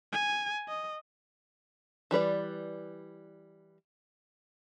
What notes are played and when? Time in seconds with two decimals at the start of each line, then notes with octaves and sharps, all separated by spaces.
0.12 G#5
0.68 D#5
2.11 E3 G3 B4 D5